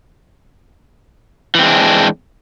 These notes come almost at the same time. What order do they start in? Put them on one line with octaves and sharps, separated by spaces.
E3 C4 G#3 D4